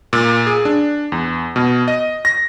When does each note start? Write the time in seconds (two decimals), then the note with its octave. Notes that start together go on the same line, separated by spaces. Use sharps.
0.13 A#2
0.47 G#4
0.65 D4
1.12 E2
1.56 B2
1.88 D#5
2.25 A#6